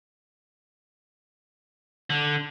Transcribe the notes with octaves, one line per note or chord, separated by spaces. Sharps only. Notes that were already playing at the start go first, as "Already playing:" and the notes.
D3